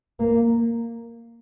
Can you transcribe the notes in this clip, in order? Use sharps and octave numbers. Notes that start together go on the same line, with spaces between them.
A#3